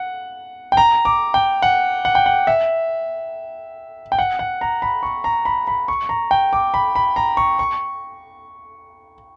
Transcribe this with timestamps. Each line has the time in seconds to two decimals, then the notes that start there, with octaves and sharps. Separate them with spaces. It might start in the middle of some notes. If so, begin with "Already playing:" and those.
Already playing: F#5
0.72 G5
0.77 A#5
1.05 D6
1.34 G5
1.62 F#5
2.05 F#5
2.15 G5
2.26 F#5
2.47 E5
4.12 G5
4.19 F#5
4.39 F#5
4.61 A#5
4.82 B5
5.03 C#6
5.24 A#5
5.45 B5
5.68 B5
5.88 C#6
6.09 A#5
6.31 G5
6.53 D6
6.74 B5
6.96 B5
7.16 A#5
7.37 C#6
7.59 C#6